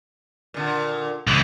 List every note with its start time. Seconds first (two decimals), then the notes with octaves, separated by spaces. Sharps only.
0.54 A#2 D3
1.27 C#2 E3